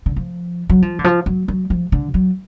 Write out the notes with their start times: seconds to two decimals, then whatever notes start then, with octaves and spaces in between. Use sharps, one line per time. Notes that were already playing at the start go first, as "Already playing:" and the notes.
0.06 D3
0.16 F3
0.70 F#3
0.82 F3
0.99 D3
1.04 F3
1.26 F#3
1.48 F#3
1.70 F3
1.92 D3
2.14 F#3